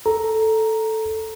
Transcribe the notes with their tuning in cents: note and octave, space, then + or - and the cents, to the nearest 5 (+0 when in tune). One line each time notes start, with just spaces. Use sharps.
A4 +0 A#5 +0